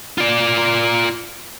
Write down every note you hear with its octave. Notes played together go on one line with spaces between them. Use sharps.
F4 D5